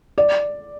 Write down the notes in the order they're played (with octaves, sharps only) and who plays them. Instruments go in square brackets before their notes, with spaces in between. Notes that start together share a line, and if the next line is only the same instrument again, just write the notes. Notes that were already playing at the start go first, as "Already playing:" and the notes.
[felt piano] D5